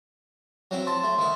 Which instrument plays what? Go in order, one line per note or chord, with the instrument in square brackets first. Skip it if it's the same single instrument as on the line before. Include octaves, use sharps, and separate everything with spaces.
[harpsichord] F#3 C4 E4
[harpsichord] A5 [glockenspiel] C6
[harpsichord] A3
D#3 E4